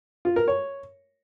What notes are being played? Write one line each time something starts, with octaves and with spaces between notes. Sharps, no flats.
F4
A#4
C#5